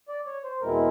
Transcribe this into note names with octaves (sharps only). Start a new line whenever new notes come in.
D5
C#5
C5
E2 B2 G#3 C4 E4 A#4